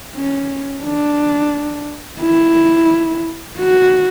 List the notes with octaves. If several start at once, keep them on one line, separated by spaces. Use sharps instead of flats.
C#4
D4
E4
F#4